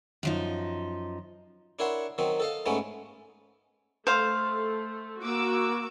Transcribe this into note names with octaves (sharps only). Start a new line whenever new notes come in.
F#2 F3 D#4
D4 E4 A#4 C#5 F#5 C6
D#3 F#3 C4 D#4
A4 D#5 F5
G#2 G#3 A3 B3 C#4 D#4
A3 C5 F5
A#3 F#4 D6 E6